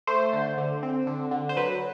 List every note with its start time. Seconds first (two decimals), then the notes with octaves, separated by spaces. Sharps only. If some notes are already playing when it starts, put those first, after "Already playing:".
0.07 A3 C5
0.33 D3
0.58 D3
0.83 C4
1.07 D3
1.31 D3
1.49 C5
1.57 F#3 B4